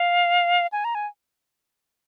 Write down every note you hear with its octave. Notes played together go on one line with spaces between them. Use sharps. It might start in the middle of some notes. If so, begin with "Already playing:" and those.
Already playing: F5
G#5
A#5
G#5